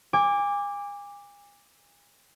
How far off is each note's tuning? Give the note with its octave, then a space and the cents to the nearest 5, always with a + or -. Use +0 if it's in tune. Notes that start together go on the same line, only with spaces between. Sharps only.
G#5 -35 D6 +0